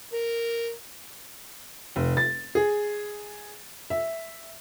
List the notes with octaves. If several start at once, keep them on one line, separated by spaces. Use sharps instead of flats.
A#4
F1
A6
G#4
E5